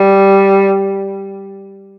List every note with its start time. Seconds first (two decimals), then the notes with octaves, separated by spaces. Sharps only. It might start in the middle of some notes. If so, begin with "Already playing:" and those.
Already playing: G3